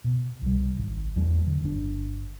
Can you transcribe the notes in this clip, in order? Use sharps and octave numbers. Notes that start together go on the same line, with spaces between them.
B2
C2 G3
G#1
E2 F#3 A3
D3
G1 D4